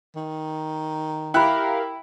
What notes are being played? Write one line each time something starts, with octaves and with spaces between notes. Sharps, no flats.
D#3
E4 G4 A#4 F5 G5 B5 F#6